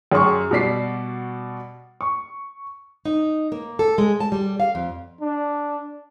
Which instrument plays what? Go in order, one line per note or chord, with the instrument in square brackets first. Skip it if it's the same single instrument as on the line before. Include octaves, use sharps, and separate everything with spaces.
[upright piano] F#2 G#4 C6 C#6
B2 G3 F#4 D5 B6 C7
C#6
[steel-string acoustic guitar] D#4
A#3
A4
G#3
A5
G3
F5
F2
[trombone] D4